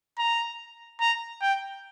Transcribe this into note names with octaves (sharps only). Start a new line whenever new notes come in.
A#5
A#5
G5